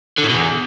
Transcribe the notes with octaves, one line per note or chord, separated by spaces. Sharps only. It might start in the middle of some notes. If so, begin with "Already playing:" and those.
D3
A2
B2
E2